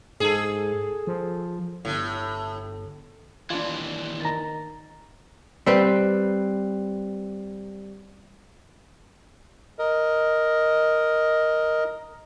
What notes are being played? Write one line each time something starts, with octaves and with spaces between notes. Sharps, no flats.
G#2 G#4 A4
F3
G1 A2
D#2 E3 D4 F4
D#3 A#5 A6
G3 C4 B4
A#4 D#5